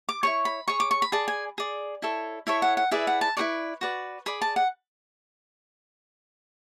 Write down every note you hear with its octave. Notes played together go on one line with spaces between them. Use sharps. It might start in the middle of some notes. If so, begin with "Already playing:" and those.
D6
E4 G#4 C#5 C#6
B5
G#4 C#5 C#6
D6
C#6
B5
G#4 D5 A5
G#5
G#4 D5
E4 A4 C#5
E4 A4 C#5 E5
F#5
F#5
E4 G#4 B4 D5 E5
F#5
A5
E4 G#4 B4 D5 C#6
F#4 B4 D5
G#4 D5 B5
A5
F#5